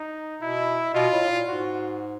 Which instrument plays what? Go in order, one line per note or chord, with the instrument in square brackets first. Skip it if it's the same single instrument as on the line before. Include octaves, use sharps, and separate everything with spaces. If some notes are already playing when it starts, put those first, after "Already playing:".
Already playing: [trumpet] D#4
[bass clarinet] B2 [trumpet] E4
[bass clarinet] B2 [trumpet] F4
[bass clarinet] A2
A2
A#2
[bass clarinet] G#2 [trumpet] F#4